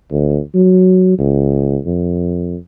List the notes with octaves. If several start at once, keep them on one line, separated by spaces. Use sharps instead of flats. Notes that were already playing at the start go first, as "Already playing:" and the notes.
D2
F#3
C#2
F2